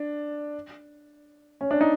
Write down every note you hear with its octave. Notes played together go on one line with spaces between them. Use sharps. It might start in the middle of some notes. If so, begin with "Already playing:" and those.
Already playing: D4
C#4
D4
D#4